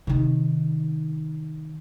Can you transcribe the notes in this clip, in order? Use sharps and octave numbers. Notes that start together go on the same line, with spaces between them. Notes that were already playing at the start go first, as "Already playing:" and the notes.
C3 D#3